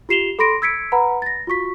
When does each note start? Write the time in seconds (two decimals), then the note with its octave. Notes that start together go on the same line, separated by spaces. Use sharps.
0.09 F4 G4 C7 E7 F7 G7
0.39 A4 B5 C6 A#6 D7
0.62 E6 G#6 B6 C#7 D7
0.92 B4 F#5 A#5 B5
1.22 A6 A#6
1.47 F4 F#4 C#6 B6